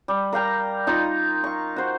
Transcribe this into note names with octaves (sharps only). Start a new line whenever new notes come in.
G3
A#4 F5 G5 A#5
D#4 F4 A#5
F5 C#6
F#4 C5